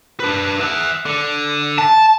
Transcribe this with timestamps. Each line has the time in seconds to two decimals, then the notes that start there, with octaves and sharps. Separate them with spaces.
0.20 D4 B4
0.60 E5 F#5
1.06 D3
1.78 A5